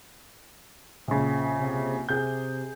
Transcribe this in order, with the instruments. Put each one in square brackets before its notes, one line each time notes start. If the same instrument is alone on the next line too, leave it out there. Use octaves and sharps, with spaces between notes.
[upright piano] A#1 C#3
[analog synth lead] C3
[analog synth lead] C3 [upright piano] G#4 G6